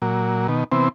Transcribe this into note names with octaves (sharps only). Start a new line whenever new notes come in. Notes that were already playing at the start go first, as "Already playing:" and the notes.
A#2 F#3
B2 D#3
C3 E3 B3 C4